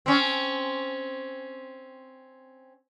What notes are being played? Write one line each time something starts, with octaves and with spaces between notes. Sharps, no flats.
C4 C#4